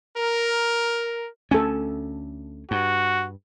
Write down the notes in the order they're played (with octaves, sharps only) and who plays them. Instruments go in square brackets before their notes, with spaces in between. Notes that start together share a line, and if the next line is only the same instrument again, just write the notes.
[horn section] A#4
[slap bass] D2 A3 C#4 [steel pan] A4 G#5
[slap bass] G2 [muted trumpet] F#4